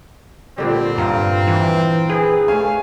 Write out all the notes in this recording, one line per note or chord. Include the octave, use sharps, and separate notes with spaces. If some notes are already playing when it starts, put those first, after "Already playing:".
A#2 D3 G3 C4
G2 F4 A#5
E3
G#4 B4
A3 C#4 F5 G#5